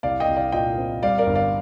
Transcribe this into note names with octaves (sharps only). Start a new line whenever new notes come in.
C2 D5 F5
D#5 G5
C2
D5 F5
A#2 D#5 G5
C4
G3 D5 F5
A#4 D5
G1
D5 F5